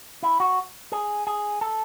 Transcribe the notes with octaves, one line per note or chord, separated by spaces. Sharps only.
E4
F#4
G#4
G#4
A4